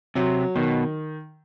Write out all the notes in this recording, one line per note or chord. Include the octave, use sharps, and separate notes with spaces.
C3 F#3
B2 D#3